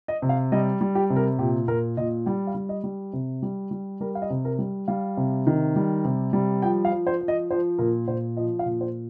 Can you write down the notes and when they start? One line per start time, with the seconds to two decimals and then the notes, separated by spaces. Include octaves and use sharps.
0.08 D#5
0.22 C3
0.29 F5
0.52 G3 D#5
0.81 G3
0.95 G4
1.10 C3
1.16 A#4
1.39 A#2 G4
1.68 A#2 A#4
1.97 A#2 D#5
2.26 G3 G5
2.47 F5
2.55 G3
2.69 D#5
2.84 G3
3.13 C3
3.43 G3
3.71 G3
4.01 G3 A#4
4.15 F5
4.22 D#5
4.30 C3
4.45 A#4
4.59 G3
4.88 G3 F5
5.17 C3
5.47 D#3
5.76 G3
6.05 C3
6.33 G3
6.62 F3 G5
6.85 F5
6.92 F3
7.07 C5
7.21 F3
7.28 D#5
7.51 F3 C5
7.78 A#2 A#4
8.08 A#2 C5
8.37 F3 D#5
8.59 F5
8.66 A#2
8.81 C5